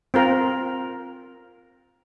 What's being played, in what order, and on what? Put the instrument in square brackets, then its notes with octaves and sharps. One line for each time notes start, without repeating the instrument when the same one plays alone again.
[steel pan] C4 F4 A#4